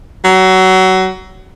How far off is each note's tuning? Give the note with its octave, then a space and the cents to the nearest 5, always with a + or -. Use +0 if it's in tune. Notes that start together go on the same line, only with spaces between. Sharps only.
F#3 +20